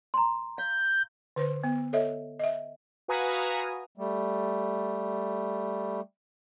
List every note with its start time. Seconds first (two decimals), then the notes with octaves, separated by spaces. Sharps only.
0.14 A#5 C6
0.58 F5 G6
1.36 D3 B4 C5
1.63 B3
1.93 A4 C#5 D#5 E5
2.39 D#5 E5
3.08 F#4 B4 F5 G#5 A#5 D#6
3.98 G3 A3